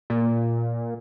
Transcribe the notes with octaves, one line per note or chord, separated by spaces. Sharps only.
A#2